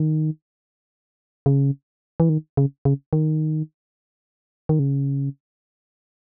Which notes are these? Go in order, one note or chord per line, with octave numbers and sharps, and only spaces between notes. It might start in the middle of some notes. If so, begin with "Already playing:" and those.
Already playing: D#3
C#3
E3
D#3
C#3
C#3
D#3
D#3
C#3